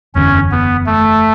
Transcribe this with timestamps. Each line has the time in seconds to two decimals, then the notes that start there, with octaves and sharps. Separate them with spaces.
0.15 F#1 E2 D3 C#4
0.51 B3
0.86 A3